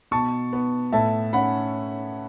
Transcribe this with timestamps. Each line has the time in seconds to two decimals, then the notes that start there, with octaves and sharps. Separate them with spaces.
0.11 B2 A5 C#6
0.53 B3
0.92 A2 E5 A5
1.33 C#4 F#5 B5